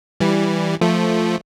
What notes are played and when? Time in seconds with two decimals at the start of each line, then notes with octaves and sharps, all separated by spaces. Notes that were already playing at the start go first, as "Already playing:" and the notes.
0.20 E3 G3
0.81 F3 A3